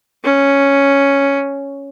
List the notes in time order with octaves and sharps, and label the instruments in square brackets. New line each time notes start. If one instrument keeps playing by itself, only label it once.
[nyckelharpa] C#4